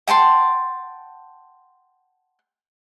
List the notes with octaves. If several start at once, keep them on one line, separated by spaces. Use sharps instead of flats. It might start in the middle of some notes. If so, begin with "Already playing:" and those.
F#5 G5 A5 C6